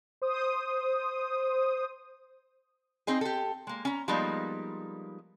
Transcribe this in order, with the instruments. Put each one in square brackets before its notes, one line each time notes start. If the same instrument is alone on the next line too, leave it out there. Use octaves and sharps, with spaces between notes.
[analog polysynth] C5 D#6
[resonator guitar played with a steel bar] C4 D#4 G#4
G4 A4
G#3 A#3
C#4 A#5
F3 G3 G#3 A#3 B3 D#4